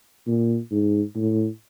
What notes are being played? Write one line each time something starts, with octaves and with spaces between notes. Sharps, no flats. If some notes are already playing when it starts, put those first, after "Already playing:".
A#2
G#2
A2